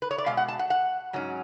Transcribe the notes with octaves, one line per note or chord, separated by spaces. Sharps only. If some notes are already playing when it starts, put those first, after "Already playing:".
B4
C#5
D5
B2 G#3 F5
F#5
A5
F#5
F#5
G#2 F#3 C#4